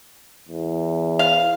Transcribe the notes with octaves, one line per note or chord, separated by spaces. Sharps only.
E2
F5